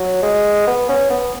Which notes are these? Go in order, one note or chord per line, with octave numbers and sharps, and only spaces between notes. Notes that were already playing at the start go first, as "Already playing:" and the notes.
Already playing: F#3
G#3
B3
C#4
B3